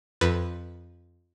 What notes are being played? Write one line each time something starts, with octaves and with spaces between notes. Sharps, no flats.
F2 B4 A6